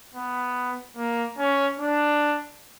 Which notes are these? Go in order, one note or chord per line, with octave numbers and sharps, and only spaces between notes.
B3
A#3
C#4
D4